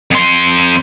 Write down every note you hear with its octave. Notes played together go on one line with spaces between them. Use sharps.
F2 C6